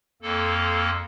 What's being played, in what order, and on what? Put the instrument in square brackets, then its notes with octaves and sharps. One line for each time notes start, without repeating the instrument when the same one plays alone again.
[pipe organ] F2 A#3 A4